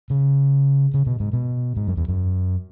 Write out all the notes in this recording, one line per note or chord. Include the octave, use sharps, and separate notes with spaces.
C#3
C#3
B2
G#2
B2
G#2
F#2
E2
F#2